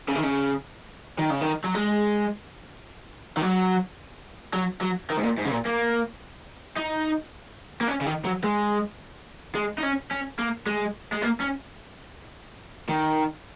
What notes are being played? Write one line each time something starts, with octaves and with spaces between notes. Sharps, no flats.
C#3
D#3
C#3
D#3
C#3
D#3
F#3
G#3
D#3
F#3
F#3
F#3
D#3
G#2
A#2
G#2
C#3
A#2
A#3
D#4
A#3
C#4
C#3
D#3
F#3
G#3
G#3
D#4
C#4
C#4
A#3
G#3
G#3
A#3
C#4
D#3